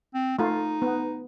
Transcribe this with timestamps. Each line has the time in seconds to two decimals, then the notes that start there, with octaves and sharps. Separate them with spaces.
0.14 C4
0.39 A3 D#4 F4
0.82 B3